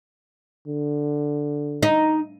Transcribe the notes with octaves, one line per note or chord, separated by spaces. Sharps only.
D3
D#4